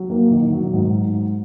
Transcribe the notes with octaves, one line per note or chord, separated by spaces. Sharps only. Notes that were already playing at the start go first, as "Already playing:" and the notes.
Already playing: F#3
A#3
D#3
F#3
G#2